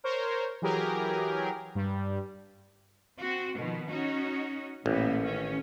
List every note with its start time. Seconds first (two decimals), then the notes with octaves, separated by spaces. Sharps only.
0.04 A#4 C5 C#5
0.62 E3 F#3 G4 G#4 A#4
1.75 G2 G3
3.19 C4 F#4
3.56 B2 D#3 F3
3.88 C#4 D#4 F#4
4.86 A1 A#2 A#3 B3
5.22 D#3 C#4